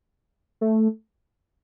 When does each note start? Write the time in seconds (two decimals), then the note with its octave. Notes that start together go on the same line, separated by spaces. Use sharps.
0.61 A3